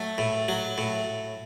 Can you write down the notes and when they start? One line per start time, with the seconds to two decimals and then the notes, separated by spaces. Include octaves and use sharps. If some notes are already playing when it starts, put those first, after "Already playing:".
Already playing: F#3 A3
0.18 A2
0.48 F#3
0.78 A2